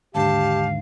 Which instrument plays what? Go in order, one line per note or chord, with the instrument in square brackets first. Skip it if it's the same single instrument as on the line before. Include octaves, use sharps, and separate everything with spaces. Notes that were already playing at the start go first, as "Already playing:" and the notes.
[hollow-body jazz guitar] D#2 G#2 D3 [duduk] G4 [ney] F5 [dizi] A5